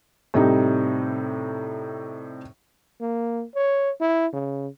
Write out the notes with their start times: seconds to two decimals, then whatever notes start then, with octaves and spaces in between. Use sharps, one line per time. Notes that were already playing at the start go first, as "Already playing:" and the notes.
0.34 A2 C3 G3 D#4
3.01 A#3
3.56 C#5
4.01 E4
4.34 C#3